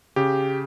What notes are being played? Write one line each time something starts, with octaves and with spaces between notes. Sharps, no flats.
C#3 G4